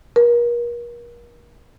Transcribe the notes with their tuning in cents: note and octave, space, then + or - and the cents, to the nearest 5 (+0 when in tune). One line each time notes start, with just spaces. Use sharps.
A#4 +35